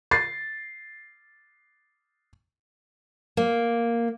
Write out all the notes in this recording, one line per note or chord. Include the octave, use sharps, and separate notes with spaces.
A6 C7
A#3